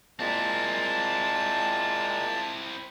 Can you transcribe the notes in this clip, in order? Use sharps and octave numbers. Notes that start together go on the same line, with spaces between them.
A#2 G#3 A#3 C4 E4 A5